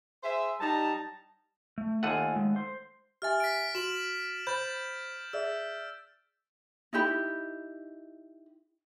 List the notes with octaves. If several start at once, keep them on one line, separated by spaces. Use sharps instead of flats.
G#4 C5 E5
G3 D#4 A5
A3
D#2 A3 F4 F#5 G#5
G#3
C5
G4 E5 G#5 F6 A6
B6 D7
F#4 E7 F#7
C5 B5 G6 A6
G#4 D5 E5 E6
D#4 E4 G4 B5